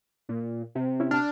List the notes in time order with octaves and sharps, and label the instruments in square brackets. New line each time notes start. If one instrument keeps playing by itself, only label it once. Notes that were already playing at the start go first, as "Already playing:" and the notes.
[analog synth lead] A#2
C3
[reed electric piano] C#4 E4
[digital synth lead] D4 [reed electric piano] A5 F6